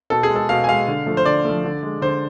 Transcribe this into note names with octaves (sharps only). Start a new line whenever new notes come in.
B2 A4
G#4
G#3
A4
B2 F5
G#5
G#3 F5
D3
F3 A3
C5
D3 D5
F3 A3
D3
G#3
D3 C5